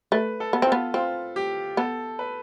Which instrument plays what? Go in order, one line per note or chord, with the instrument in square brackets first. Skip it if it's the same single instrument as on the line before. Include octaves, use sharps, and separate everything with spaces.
[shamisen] A3 [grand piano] B4
[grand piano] A4
[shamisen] B3
C4
[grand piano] F4
[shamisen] B3
[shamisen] C4 [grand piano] F4
[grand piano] G4
[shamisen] B3 [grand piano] A4
[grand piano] B4